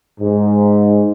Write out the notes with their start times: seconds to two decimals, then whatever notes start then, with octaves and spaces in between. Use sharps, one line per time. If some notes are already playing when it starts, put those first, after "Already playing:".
0.21 G#2